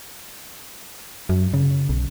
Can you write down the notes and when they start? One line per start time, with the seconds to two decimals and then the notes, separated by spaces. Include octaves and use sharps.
1.29 F#2
1.54 C#3
1.89 B1